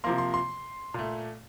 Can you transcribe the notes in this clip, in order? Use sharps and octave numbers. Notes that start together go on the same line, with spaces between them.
C3 F3 A#3 C6
C6
C6
A#2 A3